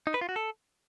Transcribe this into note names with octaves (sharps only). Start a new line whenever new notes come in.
D#4
B4
F4
F#4
A4